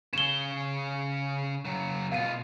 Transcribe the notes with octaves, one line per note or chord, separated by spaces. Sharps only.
C#3 C#5 E7 G7
C#3 F#3
B2 F4 F5 D#7